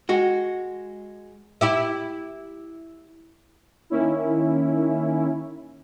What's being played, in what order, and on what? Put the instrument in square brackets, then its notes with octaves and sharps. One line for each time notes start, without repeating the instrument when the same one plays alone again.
[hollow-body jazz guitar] G#3 F#4
[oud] E4 G4 E5
[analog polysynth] D#3 A#3 C#4 E4